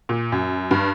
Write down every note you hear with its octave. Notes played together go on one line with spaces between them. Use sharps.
A#2
F#2
G2